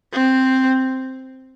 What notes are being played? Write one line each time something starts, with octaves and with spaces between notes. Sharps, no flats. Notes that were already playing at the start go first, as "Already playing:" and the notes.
C4